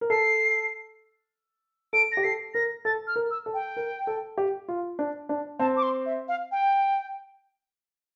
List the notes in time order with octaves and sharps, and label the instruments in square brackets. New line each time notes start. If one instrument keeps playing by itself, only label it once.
[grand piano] A#4
[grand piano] A4 [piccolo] C7
[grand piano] A4 [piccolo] D7
[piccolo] A#6
[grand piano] G4
[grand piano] A4 [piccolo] C7
[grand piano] A#4 [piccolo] A#6
[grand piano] A4 [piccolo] A6
[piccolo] F6
[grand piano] A#4
[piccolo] E6
[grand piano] A4
[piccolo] G5
[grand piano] A#4
A4
G4
F4
D4
D4
[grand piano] C4 [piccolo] A5
[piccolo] D6
C6
E5
F5
G5